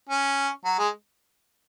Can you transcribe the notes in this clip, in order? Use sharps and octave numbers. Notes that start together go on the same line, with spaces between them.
C#4
F#3
G#3